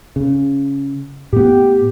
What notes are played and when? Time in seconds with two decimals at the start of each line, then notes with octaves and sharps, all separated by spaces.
0.16 C#3
1.33 A2 B3 G4